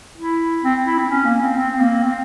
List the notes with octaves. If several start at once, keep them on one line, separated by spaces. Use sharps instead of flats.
E4
C4
E4
C4
C#4
A#3
C4
C4
C4
A#3
C4